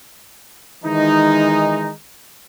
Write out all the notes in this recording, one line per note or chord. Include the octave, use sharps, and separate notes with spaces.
D#3 E3 G#3 D#4